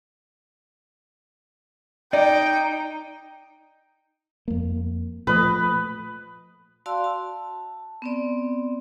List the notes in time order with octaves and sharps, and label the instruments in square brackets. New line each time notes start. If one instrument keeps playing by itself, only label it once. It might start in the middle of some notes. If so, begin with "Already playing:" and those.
[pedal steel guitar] D#4 [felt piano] D5 [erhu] G5
[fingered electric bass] F2 A#3
[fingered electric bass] A#2 F3 A3 [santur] B4 D#5
[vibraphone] F#4 D5 F5 A5 C6 E6
A5
B3 C4 D5